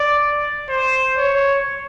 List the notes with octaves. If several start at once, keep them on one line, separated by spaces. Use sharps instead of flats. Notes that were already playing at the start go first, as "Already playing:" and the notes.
Already playing: D5
C5
C#5